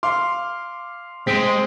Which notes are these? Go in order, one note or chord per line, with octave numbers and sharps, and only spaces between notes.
F5 C6 D6
G#3 C4 B6 D7